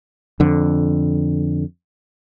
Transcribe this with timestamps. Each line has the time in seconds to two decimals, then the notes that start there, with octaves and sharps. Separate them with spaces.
0.40 F2 D3